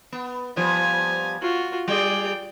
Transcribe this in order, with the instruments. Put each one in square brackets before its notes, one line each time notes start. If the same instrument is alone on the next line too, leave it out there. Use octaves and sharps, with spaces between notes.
[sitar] B3
[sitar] F3 G3 B3 [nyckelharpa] G#5
[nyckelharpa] F4 F#4
[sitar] G3 G#4 [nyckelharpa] D5 G5